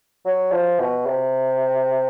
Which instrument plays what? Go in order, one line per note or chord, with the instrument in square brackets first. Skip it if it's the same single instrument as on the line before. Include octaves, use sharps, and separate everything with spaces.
[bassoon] F#3
F3
B2
C3